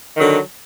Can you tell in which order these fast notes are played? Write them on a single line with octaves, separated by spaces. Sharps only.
D#3 F#3 D3